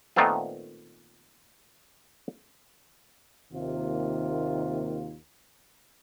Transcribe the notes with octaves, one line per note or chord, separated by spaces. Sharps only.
A#2 D#3 A3 B3 C4 F4
D#2 C3 D#3 A#3 F4